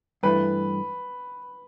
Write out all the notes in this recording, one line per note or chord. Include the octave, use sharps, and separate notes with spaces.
G2 E3 A3 B4